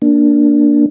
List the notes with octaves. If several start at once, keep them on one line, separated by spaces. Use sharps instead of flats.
A#3 D4